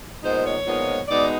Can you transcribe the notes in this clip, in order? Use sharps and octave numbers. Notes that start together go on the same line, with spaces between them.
A#2 F3 G#3 B3 D#4 C5
C#5
A#2 F3 G#3 B3 D#4
B2 G#3 B3 D#4 D5